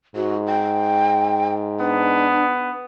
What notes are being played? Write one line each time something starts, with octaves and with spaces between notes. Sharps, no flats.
G#2 F#4
G5
B3 D4